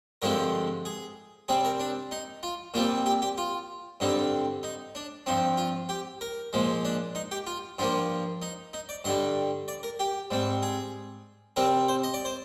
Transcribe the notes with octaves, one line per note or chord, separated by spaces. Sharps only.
G2 D3 F3 G#3 C4 A#4
G#4
C3 G3 C4 G#4
A#4
D4
D#4
F4
A#2 G3 C4 F4
G4
G4
F4
G2 D3 G3 C4 D#4
D#4
D4
G2 F3 C4 D#4
F4
G4
A#4
A#2 F3 G#3
D4
D#4
G4
F4
G2 F3 A#3 F4
D#4
D#4
D5
G2 D3 G3 D#5
D5
A#4
G4
G#2 G3 C4
G#4
C3 G3 C4 A#4
C5
D#5
D5
C5